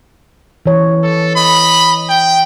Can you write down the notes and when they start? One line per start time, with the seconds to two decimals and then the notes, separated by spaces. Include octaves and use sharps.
0.66 E3 C#5
1.03 A4
1.35 D#5 B5
2.08 G5